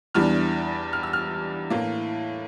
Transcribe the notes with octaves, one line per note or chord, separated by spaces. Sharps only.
E2 E3 G3 D4 F6
F6
E6
F6
A2 E3 A#3